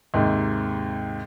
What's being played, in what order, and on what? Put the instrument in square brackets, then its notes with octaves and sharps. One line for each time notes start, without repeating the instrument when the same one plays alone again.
[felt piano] D#2 G#2 C3